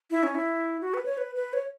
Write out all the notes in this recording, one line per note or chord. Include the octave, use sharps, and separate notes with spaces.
E4
C#4
E4
F#4
B4
C#5
B4
B4
C#5